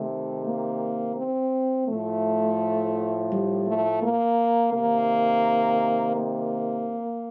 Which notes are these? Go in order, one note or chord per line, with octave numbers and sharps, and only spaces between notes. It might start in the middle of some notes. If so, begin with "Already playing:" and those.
Already playing: C3 D#3 A3
A#3
C4
A2 F3 A3
G3
A3
A#3
C3 D#3 A#3
A#3